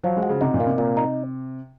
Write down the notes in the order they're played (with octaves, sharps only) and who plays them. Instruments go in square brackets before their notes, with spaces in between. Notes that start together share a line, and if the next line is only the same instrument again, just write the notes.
[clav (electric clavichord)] F3 [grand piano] F#3
[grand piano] G#3
[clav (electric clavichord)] F#4
[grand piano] C#3
[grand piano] C3 [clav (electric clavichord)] D#4
[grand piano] A#2
[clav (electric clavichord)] A#3
[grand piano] C3
[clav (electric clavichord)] A#2
D#4